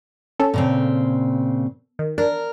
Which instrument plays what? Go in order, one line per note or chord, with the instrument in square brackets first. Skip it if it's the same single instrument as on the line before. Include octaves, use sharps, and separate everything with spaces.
[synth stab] C#4 A4
[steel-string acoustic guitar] A#2 C#3 C4
[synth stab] D#3
[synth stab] D4 [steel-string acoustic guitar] A#4